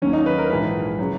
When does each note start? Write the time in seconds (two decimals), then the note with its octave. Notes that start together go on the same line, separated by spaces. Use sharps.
0.02 D#2 D#3 F#3 C#4
0.13 D#4
0.26 B4
0.38 A#4
0.50 A#1 G#2 E3 B4
0.99 C#3 F#3